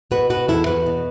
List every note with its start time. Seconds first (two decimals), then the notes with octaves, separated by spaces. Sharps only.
0.11 B2 F#4 B4
0.30 B2 F#4 B4
0.48 E2 E4 A4
0.66 E2 F#4 B4
0.86 B2